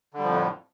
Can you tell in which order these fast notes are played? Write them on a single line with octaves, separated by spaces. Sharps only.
D3 G3 F3 F2 A2